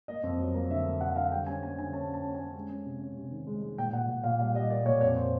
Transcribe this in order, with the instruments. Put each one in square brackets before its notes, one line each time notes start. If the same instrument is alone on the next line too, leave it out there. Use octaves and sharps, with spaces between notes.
[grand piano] A#3 D#5
F2
F#3
A#3
D3 E5
A#3
D3 F#5
D3 F5
G3 G5
C#4 G#5
A#3 G#5
D3 G#5
C#4 A5
C#4
A5
C#4
C#4 G#5
G#3
C#4
C3
C#4
C3
D#3
G#3
G#3
A#2 G5
A#2 F#5
A#2
A#2 F5
G3 F5
G3 D#5
A#3 D5
A#2 C#5
F2 C#5
C5